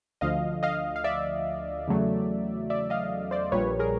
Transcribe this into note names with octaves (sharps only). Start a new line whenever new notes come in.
D2 D3 F3 D#5 F5
D#5 F5
F5
D5 E5
E2 C#3 F#3 A3
D5 E5
D#5 F5
C5 D5
A#1 A#2 G3 B4 C#5
G#4 A#4